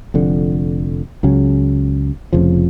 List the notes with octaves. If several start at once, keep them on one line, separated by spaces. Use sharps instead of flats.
F1 F2 D3
C#2 C#3 F#3 C#4
F1 F2 C#3 F3